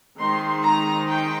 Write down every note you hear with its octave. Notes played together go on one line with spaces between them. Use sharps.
D#3 G#3 C4 D#4 C6
A#5
G5